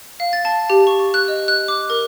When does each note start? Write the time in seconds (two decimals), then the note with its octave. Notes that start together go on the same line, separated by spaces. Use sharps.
0.20 F5
0.33 A6
0.45 A5
0.70 G4
0.87 C#6
0.99 C#6
1.14 F#6
1.28 D#5
1.48 F#6
1.68 D6
1.90 A#4